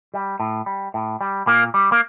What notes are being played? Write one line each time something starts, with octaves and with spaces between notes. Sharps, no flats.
G3
A2
G3
A2
G3
A#2 A#3
G3
A#3